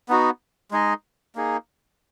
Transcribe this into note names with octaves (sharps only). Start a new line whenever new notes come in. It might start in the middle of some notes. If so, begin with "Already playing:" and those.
B3 D#4 F#4
G#3 D#4 G#4 D#5
A#3 D#4 G#4